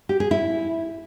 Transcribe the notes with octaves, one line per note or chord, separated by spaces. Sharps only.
G4
G#4
E4